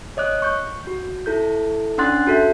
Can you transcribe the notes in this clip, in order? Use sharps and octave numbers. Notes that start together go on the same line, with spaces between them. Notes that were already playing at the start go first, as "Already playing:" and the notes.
C#5 D#5 D6 F#6
C#6 G6
F#4
E4 A4 G6
C#4 D4 F#5 C6 F#6 A6
F#4 A4 E5